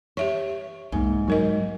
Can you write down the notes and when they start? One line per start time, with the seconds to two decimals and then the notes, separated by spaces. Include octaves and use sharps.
0.17 G4 C#5 E5 C#6
0.92 C2 G#2 A#3
1.28 G2 F#3 D#4 A#4 D#5